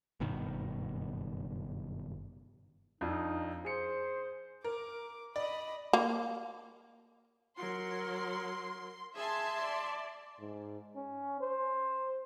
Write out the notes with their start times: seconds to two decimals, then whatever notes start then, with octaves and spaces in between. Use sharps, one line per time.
0.20 F#1 G2 B2 D#3
3.01 F2 D4 D#4 F4
3.65 G#4 C5 C#7
4.64 A#4 D6
5.36 D5 D#5 B5
5.93 A#3
7.58 F#3 A#4 C6
9.16 G#4 E5 G#5 A5 C6
9.61 D5
10.40 G#2
10.96 C#4
11.41 C5